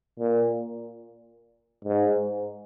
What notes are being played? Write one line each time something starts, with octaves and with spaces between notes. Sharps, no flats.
A#2
G#2